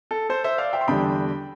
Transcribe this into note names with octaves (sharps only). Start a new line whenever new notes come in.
A4
A4 C5
C5 E5
D5 F5
E5 G5
C6
E2 D3 G3 G5 B5